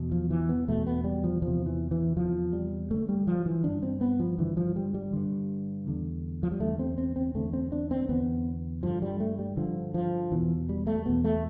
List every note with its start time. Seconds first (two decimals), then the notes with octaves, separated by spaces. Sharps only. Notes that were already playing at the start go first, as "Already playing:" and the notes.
Already playing: E2 B2
0.12 F3
0.30 E3
0.49 B3
0.68 E2 B2 A3
0.87 B3
1.04 G3
1.24 F3
1.42 E2 C3 F3
1.66 E3
1.91 E3
2.16 E2 C3 F3
2.53 G3
2.90 G2 D3 A3
3.09 G3
3.27 F3
3.46 E3
3.64 G2 D3 D4
3.83 C4
4.01 B3
4.20 F3
4.38 G2 D3 E3
4.57 F3
4.76 G3
4.94 G3
5.13 G2 D3
5.87 E2 D3
6.43 F3
6.52 G3
6.60 E2 D3 A3
6.79 C4
6.98 C4
7.16 C4
7.34 E2 D3 A3
7.53 C4
7.72 D4
7.91 C4
8.09 E2 D3 B3
8.83 G2 D3 F3
9.02 G3
9.20 A3
9.39 G3
9.57 G2 D3 F3
9.94 F3
10.32 E2 B2 E3
10.69 G3
10.87 A3
11.05 E2 B2 B3
11.24 A3